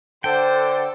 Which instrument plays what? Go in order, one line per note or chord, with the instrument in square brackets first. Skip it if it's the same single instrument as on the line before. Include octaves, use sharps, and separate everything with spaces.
[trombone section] D3 [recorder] A4 [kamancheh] C5 [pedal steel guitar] G5